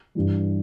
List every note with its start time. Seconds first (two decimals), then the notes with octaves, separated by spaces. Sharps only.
0.15 G2 E3 G3